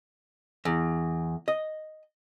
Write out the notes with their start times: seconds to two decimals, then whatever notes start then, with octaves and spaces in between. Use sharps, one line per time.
0.65 E2
1.48 D#5